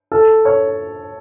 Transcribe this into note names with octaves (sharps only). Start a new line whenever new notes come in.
A4
C#5